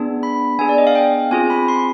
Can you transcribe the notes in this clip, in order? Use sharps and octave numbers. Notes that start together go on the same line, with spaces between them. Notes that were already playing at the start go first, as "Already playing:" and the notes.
Already playing: B3 D4 G#4
B5
B3 D4 G#4 G#5
D5
D#5
F5
G5
C4 F4 G#4 G#5
B5
C6